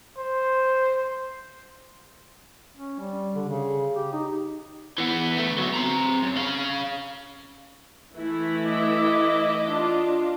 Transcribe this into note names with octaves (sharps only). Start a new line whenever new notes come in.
C5
C#4
G3
D3
C#3
G4
D#4
E3 B3
D2 A3
F#3 B3
C4 A#5
F#2
C#4 F5
E3 A3 E4
D#5 D6
D4 F4